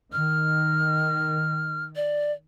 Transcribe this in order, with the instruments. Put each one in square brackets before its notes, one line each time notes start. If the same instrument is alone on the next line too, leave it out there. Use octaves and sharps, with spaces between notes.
[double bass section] D#3 [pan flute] F6
[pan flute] D5